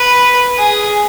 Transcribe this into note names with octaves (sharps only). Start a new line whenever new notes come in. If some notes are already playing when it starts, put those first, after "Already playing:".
Already playing: B4
G#4